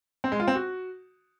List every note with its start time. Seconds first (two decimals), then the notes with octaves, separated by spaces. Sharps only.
0.24 C4
0.32 G#3
0.40 F4
0.48 C4
0.55 F#4